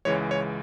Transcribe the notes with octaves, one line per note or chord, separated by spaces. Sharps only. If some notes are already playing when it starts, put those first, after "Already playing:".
C#2 C#3 E3 G#3 C#5
C#5